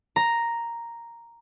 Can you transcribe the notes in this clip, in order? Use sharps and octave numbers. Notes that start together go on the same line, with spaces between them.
A#5